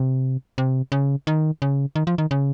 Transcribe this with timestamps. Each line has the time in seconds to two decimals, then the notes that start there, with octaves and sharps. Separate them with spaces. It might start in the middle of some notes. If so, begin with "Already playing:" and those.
Already playing: C3
0.58 C3
0.92 C#3
1.27 D#3
1.62 C#3
1.95 D#3
2.07 F3
2.18 D#3
2.31 C#3